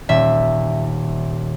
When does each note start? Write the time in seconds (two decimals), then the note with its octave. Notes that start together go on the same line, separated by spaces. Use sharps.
0.09 D#1 E5